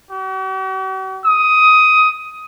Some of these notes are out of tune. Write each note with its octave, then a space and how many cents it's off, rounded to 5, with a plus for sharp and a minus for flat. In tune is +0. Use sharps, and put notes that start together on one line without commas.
F#4 +45
D#6 +10